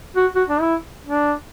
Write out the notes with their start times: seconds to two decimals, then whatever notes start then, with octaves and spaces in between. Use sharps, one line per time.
0.16 F#4
0.35 F#4
0.50 D4
0.61 E4
1.06 D4